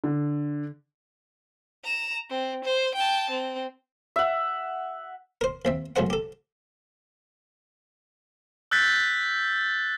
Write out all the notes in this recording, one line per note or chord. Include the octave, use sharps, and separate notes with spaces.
D3
A#5 E7
C4
C5
G5 A5
C4
E5 F#5
A#4 C5
D#2 C4 E5
B1 F#2 A2 G#3 C5 F#5
G4 A4
E6 F#6 G6 A6 B6